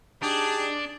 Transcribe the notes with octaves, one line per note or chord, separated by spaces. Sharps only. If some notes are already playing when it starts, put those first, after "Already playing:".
D4 D#4 G4 G#4